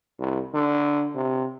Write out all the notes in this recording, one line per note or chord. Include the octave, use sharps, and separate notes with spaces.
C2
D3
C3